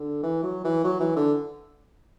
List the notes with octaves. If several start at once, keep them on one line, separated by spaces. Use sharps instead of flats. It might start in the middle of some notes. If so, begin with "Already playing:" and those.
Already playing: D3
E3
F#3
E3
F#3
E3
D3